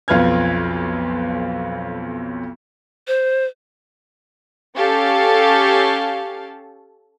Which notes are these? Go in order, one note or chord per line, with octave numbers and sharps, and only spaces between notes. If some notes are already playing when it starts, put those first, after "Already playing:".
B1 F2 F4 B4 F6 G#6
C5
C#4 G4 A4 F5